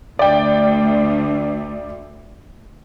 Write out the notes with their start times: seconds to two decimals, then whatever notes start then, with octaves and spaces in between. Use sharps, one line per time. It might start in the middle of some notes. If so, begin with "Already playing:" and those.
0.19 D2 D5 G5